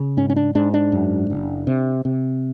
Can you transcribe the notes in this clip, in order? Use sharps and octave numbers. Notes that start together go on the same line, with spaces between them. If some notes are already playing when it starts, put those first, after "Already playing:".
Already playing: C#3
G#2 C#4
C#4
D4
G#2 D4
D4
F#2
F#1
C3
C3